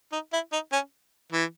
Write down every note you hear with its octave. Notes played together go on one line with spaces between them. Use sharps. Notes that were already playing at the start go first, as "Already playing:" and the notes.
D#4
E4
D#4
C#4
E3